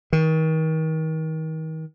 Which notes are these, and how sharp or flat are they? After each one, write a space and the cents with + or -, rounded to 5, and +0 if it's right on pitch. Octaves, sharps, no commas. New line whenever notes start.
D#3 +35